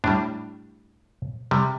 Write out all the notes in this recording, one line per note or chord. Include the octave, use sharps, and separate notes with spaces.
A2 G3 D4
C3 G3